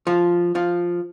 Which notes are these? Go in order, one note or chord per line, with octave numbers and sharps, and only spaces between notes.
F3 F4
F3 F4